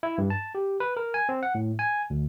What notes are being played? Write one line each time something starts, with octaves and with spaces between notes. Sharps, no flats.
E4
G2
A5
G4
B4
A#4
G#5
C4
F#5
A2
G#5
D2